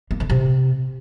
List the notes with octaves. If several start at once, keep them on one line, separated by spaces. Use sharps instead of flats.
A#3
D3
C3